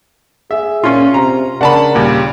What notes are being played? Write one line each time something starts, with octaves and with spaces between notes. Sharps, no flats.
G#4 E5
A#2 C#4 F4 C6
C3 A#5
C#3 D4 A#4 F#5 A5 B5
D#2 A#2 G3